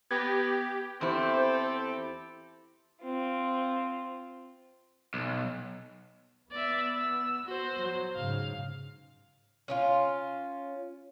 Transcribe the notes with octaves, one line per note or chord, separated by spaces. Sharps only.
B3 G4 G#6 A#6
E2 C4 E4 G4 A4 C5
C4 F4
B1
B3 D5 E5
E6
F#4 C5
F#3
G#2 C#3 F5
C#4 D#4 F4